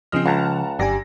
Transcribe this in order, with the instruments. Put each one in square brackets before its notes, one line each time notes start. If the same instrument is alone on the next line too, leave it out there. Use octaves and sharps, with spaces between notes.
[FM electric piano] C#3 F3 F6 [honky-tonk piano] C4 D#5
[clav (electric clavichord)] C#2 [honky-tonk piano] F#5 A5 A#5
[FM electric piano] G1 G4 G#5 [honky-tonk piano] F#2 D5 A#6